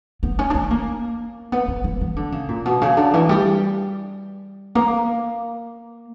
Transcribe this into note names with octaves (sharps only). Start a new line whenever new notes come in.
B3
C#4
D4
C#4
A#3
B3
C#4
A#3
E3
D3
C#3
A#2
B2
C#3
D3
E3
G3
A#3